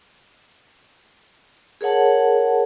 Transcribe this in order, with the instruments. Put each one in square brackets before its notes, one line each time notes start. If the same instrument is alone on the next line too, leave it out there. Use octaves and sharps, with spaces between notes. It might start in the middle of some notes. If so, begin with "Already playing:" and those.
[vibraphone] G#4 A#4 C#5 F#5 A5